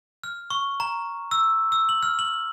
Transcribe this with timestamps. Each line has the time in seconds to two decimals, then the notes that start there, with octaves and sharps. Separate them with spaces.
0.24 F6
0.50 C#6
0.80 A#5
1.31 E6
1.72 E6
1.89 F#7
2.03 F6
2.19 F#7